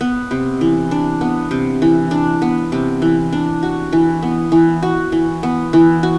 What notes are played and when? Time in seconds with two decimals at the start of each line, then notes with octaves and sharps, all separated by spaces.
0.01 B3
0.31 C3
0.61 E3
0.91 D4
1.21 B3
1.51 C3
1.82 E3
2.11 D4
2.42 B3
2.72 C3
3.02 E3
3.32 D4
3.63 F#4
3.93 E3
4.23 B3
4.52 E3
4.82 F#4
5.12 E3
5.43 B3
5.73 E3
6.03 F#4